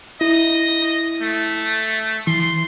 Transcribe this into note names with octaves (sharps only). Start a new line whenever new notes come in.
E4 D#5
A3
E3 C6